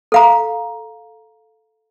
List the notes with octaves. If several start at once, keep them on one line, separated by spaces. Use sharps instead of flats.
A4 F5 A#5